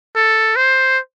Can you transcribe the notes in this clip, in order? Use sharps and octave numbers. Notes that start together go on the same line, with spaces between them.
A4
C5